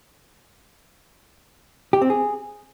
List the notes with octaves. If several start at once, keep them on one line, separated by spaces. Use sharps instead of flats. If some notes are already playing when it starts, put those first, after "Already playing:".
G4
C4
G#4